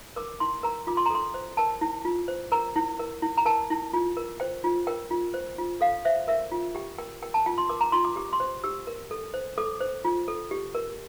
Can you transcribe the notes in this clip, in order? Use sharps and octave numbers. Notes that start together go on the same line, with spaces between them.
A#4 D6
E4 C6
A#4 A#5
F4 D6
C6
A#5
A4 C6
C5
A#4 A5
E4
F4
C5
A#4 A#5
E4
A#4
E4
A#5
A#4 A5
E4
F4
A#4
C5 G5
F4
A#4 G5
F4
C5
F4
A4 F5
C5 E5
A#4 E5
F4
G4 G5
A#4 G5
A#4 G5
A5
F4 G5
C6
A#4 D6
A#5
F4 C6
D6
G4 D6
C6
C5
G4 E6
A#4
A4
C5
A4 D6
C5
F4
A4
G4
A#4